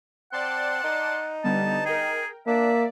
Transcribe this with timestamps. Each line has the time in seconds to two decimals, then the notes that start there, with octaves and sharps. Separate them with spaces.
0.33 C4 D5 F#5 A5 C6
0.84 D#4
1.44 D3 G3 B3 A5
1.86 G#4 A#4 G5
2.47 A#3 D4 D5 E5